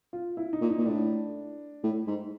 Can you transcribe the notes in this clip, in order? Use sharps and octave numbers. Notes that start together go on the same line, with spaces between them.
F4
E4
D#4
A#2
D#4
A#2
A2 D4
A2
G#2